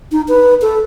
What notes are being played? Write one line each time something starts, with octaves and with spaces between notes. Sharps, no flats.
D#4
B4
A4